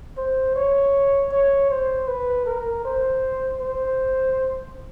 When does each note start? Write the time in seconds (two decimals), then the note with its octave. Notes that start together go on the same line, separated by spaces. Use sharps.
0.17 C5
0.56 C#5
1.32 C#5
1.70 C5
2.08 B4
2.46 A#4
2.85 C5
3.60 C5